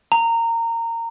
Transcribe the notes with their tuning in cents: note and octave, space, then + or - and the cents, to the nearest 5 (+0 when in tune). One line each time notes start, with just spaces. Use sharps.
A#5 -20